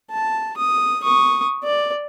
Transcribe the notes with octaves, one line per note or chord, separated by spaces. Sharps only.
A5
D#6
C#6 D#6
D5